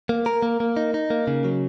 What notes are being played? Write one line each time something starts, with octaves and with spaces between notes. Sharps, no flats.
A#3
A#4
A#3
A#3
D#4
D#4
A#3
C#3
F#3